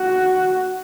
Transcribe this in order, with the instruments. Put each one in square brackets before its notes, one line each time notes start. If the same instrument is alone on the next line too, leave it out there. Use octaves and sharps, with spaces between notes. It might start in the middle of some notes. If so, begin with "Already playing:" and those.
Already playing: [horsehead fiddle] F#4